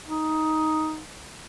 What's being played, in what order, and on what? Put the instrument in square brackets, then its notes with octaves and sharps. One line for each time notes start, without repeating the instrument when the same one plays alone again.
[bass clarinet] D#4